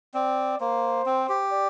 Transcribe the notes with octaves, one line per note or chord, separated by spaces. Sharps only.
C4 D5
A#3 C5
C4
G4
D5